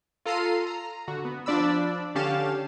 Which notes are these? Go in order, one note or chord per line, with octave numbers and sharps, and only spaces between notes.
F4 A4 A#5 F6 C7 D#7
A#5
D3 F#4
B3
F3 D4 D5 B5 E6
D3 C#4 G4 F5 A5 E7